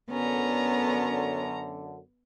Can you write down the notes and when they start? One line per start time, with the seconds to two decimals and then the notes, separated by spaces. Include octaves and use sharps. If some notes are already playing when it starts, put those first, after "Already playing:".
0.11 F#2 D3 B3 C#4 A#5